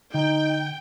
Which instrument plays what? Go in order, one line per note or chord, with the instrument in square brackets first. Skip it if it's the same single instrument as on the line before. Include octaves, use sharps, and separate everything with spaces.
[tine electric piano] D3 [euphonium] D#4 [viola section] G5